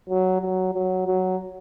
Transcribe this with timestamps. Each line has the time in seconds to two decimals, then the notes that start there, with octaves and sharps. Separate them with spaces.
0.09 F#3
0.41 F#3
0.74 F#3
1.07 F#3